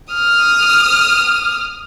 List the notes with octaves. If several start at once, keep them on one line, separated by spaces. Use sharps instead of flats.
D#6 F6